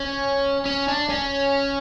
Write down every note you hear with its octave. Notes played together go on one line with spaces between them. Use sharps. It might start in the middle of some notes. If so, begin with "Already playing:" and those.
Already playing: C#4
C#4
D4
C#4